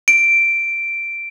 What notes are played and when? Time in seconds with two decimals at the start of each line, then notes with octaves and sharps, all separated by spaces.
0.08 D7